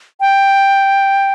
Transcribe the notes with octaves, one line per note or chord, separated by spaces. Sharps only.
G5